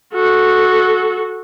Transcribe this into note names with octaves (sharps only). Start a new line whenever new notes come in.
F#4 A4